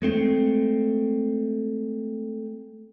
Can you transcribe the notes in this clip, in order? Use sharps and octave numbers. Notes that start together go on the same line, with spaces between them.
G#3 A3 C4